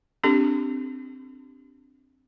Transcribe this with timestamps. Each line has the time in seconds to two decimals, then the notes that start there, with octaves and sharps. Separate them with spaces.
0.24 C4 D4 G4 A4